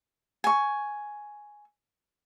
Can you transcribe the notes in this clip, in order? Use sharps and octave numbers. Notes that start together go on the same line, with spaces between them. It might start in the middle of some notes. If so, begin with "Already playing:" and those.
G#5 C#6